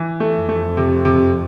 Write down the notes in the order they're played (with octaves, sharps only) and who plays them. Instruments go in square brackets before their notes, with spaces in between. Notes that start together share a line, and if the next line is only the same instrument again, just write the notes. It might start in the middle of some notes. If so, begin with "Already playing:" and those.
Already playing: [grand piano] E3
A3
[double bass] F2
[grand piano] A3
C3
C3